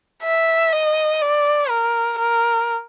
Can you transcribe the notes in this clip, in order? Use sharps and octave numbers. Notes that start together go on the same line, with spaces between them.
E5
D#5
D5
A#4
A#4